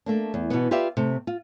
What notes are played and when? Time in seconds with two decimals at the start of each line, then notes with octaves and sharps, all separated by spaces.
0.06 A3 A#3 D4
0.34 E2
0.50 B2 E3 B3
0.71 F4 G4 B4 D5 E5 F5
0.97 C3 A3
1.27 F4